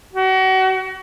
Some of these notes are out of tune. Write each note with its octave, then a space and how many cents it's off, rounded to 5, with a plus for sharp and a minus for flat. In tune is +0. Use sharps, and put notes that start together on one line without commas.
F#4 +35